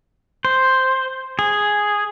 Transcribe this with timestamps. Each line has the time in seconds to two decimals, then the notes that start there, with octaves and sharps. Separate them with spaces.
0.45 C5
1.39 G#4